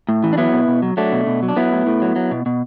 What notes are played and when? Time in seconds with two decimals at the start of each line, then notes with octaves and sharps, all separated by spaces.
0.09 A2
0.24 E3
0.33 D4
0.38 F#3 B3 E4
0.53 B2
0.68 B2
0.82 F#3
0.97 F#3 A3 D4
1.12 B2
1.27 B2
1.43 F#3
1.48 D4
1.56 F#3 B3 E4
1.72 A2
1.87 A2
2.02 F#3
2.16 F#3
2.31 B2
2.46 B2